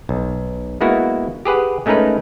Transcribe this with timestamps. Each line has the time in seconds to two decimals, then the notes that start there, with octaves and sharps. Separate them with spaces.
0.09 B1
0.81 G#3 A#3 B3 E4 F#4
1.45 G4 G#4 B4 F#5
1.86 G#3 A3 C#4 D#4 A#4 B4